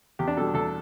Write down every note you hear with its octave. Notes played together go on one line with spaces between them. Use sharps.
E2 G4
D4
B2 G3 A4
E2 A4